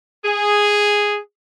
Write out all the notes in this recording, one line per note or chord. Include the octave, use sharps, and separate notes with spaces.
G#4